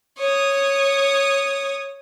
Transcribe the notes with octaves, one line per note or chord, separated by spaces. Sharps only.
C#5 D#6